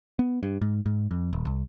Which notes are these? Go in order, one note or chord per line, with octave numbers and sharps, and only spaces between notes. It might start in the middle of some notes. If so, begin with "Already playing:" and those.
B3
G2
G#2
G#2
F2
D#1
C2